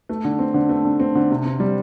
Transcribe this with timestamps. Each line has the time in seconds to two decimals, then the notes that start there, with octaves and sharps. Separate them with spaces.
0.09 A3
0.25 D3
0.39 C4
0.54 D3
0.69 A3
0.85 D3
1.00 C4
1.15 D3
1.31 C3
1.45 C4
1.60 G3